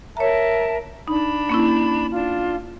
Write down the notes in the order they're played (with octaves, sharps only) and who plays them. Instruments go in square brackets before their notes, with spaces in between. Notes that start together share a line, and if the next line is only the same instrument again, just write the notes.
[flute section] A#4 E5 A5 [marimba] C#5 A#5
[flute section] D4 B5 [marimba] D#4
[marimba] A#3 C#4 E4
[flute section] D4 F4